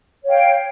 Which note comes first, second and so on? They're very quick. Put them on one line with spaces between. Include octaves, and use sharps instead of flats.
C#5 F5 G5